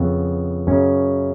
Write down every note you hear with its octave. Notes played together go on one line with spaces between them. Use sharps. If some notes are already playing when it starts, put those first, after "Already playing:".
Already playing: F2 C#3 B3
F#2 C#3 C#4